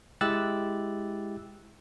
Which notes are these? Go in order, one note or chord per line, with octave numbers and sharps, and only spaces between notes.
G#3 E4 G4 E6 F#6 A6